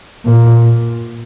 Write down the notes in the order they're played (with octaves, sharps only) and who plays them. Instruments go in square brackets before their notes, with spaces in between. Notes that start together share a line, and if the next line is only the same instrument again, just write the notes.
[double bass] A#2